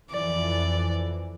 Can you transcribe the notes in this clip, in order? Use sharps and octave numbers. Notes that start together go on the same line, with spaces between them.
F2 E3 D5